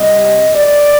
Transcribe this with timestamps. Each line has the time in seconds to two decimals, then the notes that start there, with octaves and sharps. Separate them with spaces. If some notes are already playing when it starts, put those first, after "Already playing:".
Already playing: C3 G3 D#5
0.56 D5